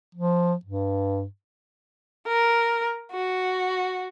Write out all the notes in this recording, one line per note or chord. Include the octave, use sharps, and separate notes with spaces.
F3
G2
A#4
F#4